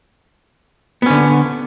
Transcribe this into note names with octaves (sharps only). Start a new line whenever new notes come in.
D3 B3 C#4